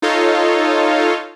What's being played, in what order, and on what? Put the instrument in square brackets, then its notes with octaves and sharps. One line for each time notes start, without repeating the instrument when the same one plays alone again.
[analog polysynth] D#4 F4 A4 C#5 D#5 F5